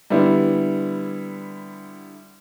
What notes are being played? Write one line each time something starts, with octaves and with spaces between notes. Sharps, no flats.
D3 G3 B3 E4